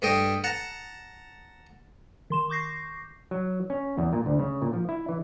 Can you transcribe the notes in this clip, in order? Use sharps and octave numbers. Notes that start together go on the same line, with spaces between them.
G2 A3 D#5 G5
F#5 A5 A#5
D#3 C6 E7
C#6 D6 G6 A#6 C7
F#3
C#4
E2
A#2
D2
C#3
A#2
F3
E4
E3